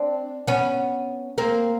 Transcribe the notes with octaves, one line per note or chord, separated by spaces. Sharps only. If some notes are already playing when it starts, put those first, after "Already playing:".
Already playing: C4 D4
B3 C#4
A#3 C4